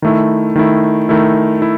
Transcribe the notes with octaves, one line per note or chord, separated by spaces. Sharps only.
D#3 A3 E4
D#3 A3 E4
D#3 A3 E4
E4